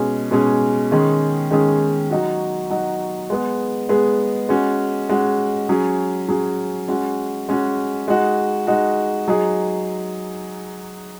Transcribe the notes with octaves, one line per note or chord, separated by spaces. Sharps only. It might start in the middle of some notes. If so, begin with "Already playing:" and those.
Already playing: B2 G#3 C#4 G#4
B2 G#3 C#4 G#4
D#3 G#3 C#4 G#4
D#3 G#3 C#4 G#4
F#3 D#4 F#4
F#3 D#4 F#4
G#3 B3 G#4
G#3 B3 G#4
G#3 C#4 F#4
G#3 C#4 F#4
F#3 C#4 G#4
F#3 C#4 G#4
G#3 C#4 F#4
G#3 C#4 F#4
G#3 D#4 F#4
G#3 D#4 F#4
F#3 D#4 G#4